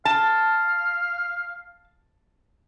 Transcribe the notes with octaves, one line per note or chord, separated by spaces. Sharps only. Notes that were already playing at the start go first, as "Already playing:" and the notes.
F5 A5